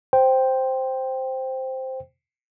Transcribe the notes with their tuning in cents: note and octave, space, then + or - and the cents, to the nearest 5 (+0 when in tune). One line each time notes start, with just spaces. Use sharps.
C5 +0 G5 +0